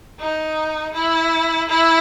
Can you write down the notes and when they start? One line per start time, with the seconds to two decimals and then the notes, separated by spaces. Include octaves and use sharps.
0.20 D#4
0.94 E4
1.69 E4